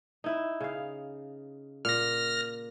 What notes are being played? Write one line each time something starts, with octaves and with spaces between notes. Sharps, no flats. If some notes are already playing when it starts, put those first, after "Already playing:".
D#4 E4 E5
C#3 F5
A#2 F6 A#6